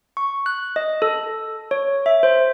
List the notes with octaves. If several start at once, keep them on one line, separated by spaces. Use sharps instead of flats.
C#6
F#6
D#5
A4
C#5
E5
C5